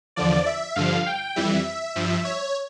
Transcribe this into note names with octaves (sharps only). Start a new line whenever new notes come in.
E2 D3 F3 D5
E5
G2 D3 F3 F5
G5
F2 E3 G3 E5
G2 F3
C#5